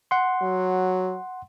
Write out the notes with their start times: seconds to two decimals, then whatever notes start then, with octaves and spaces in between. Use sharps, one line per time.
0.11 F#5 C6
0.42 F#3